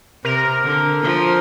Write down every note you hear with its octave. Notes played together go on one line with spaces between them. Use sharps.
C3 A#4
D3
F3